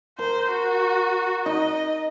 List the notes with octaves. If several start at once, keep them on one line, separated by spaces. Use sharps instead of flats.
A#4 C5
F#4
D#4 D#5